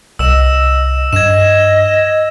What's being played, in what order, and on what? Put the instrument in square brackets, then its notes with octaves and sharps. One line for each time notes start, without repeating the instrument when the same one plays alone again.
[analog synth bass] C2 [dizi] D#5 [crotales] E6 E7
[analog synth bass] G2 [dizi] D#5 [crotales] G#6 E7